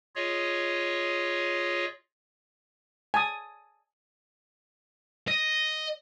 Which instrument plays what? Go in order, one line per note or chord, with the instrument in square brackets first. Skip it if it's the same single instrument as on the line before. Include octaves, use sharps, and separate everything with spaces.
[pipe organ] F4 G#4 C#5 D#5
[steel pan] G#5 A5 D#6
[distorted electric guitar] D#5